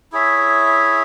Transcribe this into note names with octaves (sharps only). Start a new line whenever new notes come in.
E4 G#4 C#5 E5